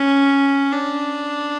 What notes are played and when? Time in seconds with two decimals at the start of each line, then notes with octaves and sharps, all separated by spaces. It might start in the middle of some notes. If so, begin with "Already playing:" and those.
Already playing: C#4
0.72 D4